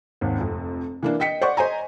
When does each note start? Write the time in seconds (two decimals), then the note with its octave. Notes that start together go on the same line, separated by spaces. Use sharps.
0.21 G#1 D#2
0.38 F1 F2
1.03 E3 A#3 D4
1.20 D#5 G5 B6 C#7
1.41 C5 D5 F#5 C#6
1.57 C5 D#5 G#5 A#5